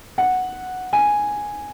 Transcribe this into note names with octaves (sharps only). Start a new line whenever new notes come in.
F#5
G#5